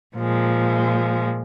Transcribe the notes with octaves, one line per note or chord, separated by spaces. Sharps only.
A#2 F3 G#3